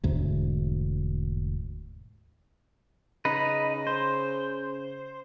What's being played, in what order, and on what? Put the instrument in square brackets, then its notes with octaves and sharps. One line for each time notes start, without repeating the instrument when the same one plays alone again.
[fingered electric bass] E1 D2 G#2
[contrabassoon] C#3 [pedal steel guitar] D#4 B4
[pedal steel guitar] C5